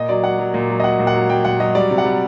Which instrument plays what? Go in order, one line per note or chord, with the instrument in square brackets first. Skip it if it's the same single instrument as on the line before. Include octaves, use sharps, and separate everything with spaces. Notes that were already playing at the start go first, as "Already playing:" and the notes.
Already playing: [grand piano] A#2 D#5
F#3 D5
F#3 F#5
F#3
A#2
F#3
D#5
F#3 F#5
A#2
F#5
F#3
F#3 G5
A#2 F#5
F#3 D#5
G3 D5
C3
F#5
G3